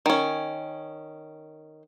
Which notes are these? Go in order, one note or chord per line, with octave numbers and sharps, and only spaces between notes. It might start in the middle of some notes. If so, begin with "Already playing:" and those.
D#3 C#4